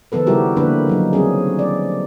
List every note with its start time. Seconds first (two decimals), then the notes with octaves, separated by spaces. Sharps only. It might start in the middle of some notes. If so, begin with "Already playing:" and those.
0.12 D#3 F3 B3 A4 B4
0.26 C#3 G3 E4 F#4 G4 A#4
0.56 D3 F3 A#3 D4 B4
0.87 D#3 F#3 D#4
1.13 G3 C4 C#4 G#4
1.59 D5